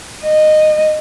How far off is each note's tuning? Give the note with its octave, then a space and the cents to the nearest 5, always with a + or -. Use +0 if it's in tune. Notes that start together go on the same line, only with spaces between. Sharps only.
D#5 -15